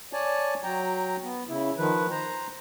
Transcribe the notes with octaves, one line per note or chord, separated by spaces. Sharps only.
C#5 D5 G#5 A5
F#3 G5 A#5
B3
C#3 E4
D#3 F3 B4
C5 A#5